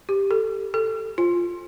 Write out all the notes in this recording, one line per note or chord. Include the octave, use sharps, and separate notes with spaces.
G4
A4
A4
F4